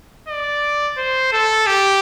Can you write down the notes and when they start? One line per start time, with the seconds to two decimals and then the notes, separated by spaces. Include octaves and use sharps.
0.28 D5
0.97 C5
1.32 A4
1.67 G4